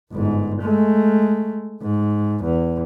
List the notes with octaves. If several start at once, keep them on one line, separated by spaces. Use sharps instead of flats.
G1 G#2
G#3 A3
G#2
E2